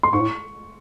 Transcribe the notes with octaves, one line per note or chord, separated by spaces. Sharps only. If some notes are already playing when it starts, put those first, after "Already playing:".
C6
G#2 C#6
A2